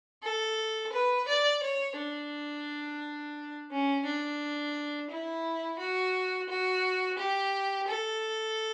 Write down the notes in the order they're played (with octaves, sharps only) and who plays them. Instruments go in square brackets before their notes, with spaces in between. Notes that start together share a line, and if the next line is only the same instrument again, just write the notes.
[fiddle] A4
B4
D5
C#5
D4
C#4
D4
E4
F#4
F#4
G4
A4